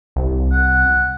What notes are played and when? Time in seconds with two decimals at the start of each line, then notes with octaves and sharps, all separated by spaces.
0.16 C2
0.51 F#5